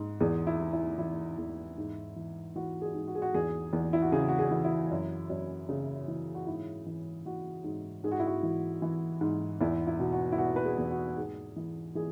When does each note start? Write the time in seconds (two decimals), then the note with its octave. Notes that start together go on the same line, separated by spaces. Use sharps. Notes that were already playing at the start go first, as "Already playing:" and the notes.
Already playing: G#2
0.20 E2 G#4
0.47 E4
0.60 E3
0.73 E4
0.98 E3 E4
1.38 E2
1.78 G#2
2.16 E3
2.56 E3 F#4
2.82 G#4
2.94 G#2
3.08 F#4
3.15 G#4
3.22 F#4
3.34 E2 G#4
3.73 E2
3.93 E4
4.02 F#4
4.12 C#3 G#4
4.28 F#4
4.39 G#4
4.51 E3
4.64 E4
4.91 F#2
5.30 F#2
5.69 C#3
6.08 E3
6.35 F#4
6.47 G#2 E4
6.86 E3
7.26 E3 F#4
7.64 G#2
8.04 G#2 G#4
8.12 F#4
8.20 E4
8.27 F#4
8.43 E3
8.82 E3
9.21 G#2
9.61 E2 E4
9.87 E4
10.00 B2
10.12 F#4
10.32 E4
10.38 B2 F#4
10.56 B4
10.65 G#4
10.78 E2
10.91 F#4
11.17 G#2 G#4
11.56 E3
11.95 E3 G#4